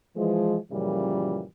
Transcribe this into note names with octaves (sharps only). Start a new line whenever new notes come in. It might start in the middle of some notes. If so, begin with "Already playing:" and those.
E3 F3 G#3
F#2 A#2 C#3 E3 F3 G3